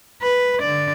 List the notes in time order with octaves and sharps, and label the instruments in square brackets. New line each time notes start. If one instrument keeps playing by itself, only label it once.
[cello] B4
D3 D5